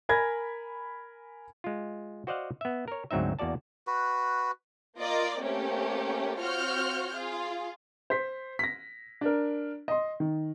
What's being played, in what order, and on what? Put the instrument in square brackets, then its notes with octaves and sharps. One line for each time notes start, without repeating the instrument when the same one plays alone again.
[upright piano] A#4 G#5 B5 G#6 A#6
[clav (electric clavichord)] G#3 F4
F#4 C5 D5 D#5 F5 F#5
B3 E5
A#4 C#5
D2 G#2 F#3 C4 D#4 E5
E2 A#3 F#4 D5 A5
[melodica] F#4 B4
[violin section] A#3 F4 A#4 D5 D#5
A3 A#3 C4 C#4 G4
C4 F4 F#4 C#5 F6 G6
F4 G#4 F5
[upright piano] C5 B6
A#6 B6
D4 A#4
D#5 C6
D#3